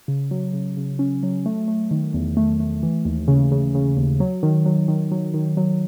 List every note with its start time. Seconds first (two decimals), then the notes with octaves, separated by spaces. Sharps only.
0.08 C#3
0.31 F#3
0.53 C#3
0.77 C#3
0.99 C#4
1.23 F#3
1.46 A3
1.68 A3
1.91 D#3
2.14 E2
2.37 A3
2.60 A3
2.83 E3
3.05 D#2
3.28 C#3
3.52 C#3
3.75 C#3
3.97 D#2
4.20 F#3
4.43 D#3
4.66 F#3
4.88 D#3
5.12 F#3
5.34 D#3
5.57 F#3